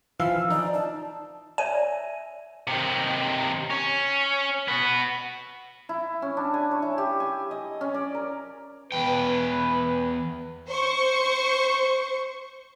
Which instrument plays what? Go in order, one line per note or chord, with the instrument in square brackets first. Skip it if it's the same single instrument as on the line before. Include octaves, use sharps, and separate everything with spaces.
[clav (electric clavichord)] E3 F3 F5 [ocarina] E6
[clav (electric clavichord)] D#4 [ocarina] D5
[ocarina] A5
[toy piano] C#5 D5 [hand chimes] E5 [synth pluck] G#5
[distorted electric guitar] C3 D#3
C#4
B3 F#4
[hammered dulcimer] E4
C#4
D4
G#5
C#5
E4
G4
G#5
D#5
C#4
D5
A#4
[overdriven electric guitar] E2 G5 [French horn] B4
[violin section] C5 C#6